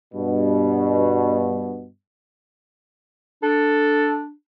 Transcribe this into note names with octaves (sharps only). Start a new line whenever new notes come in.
G2 B2
D4 A4